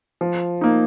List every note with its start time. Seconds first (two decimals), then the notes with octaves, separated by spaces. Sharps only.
0.21 F3
0.61 A#3 D#4